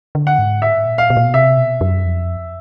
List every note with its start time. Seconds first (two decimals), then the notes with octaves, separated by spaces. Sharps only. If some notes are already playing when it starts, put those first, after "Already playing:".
0.15 D3
0.27 F#5
0.39 G#2
0.62 A2 E5
0.86 A#2
0.98 F5
1.10 B2
1.17 A#2
1.24 B2
1.34 C3 E5
1.57 B2
1.81 F#2
2.05 F2